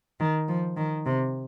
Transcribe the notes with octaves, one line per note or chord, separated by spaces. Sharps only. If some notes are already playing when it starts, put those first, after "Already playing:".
D#3
F3
D#3
C3